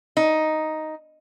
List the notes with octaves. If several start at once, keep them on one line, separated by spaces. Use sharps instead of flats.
D#4